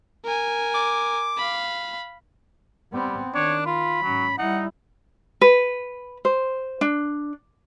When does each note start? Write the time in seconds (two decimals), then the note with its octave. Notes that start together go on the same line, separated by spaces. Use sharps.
0.25 A#4 G#5
0.74 D6
1.38 F5 B5
2.93 G3 B3 C4
3.34 D#3 D4 C#5
3.66 F4 B5
4.02 G#2 F#3 C#4
4.38 G3 D#4 E4 F#5
5.41 B4
6.25 C5
6.81 D4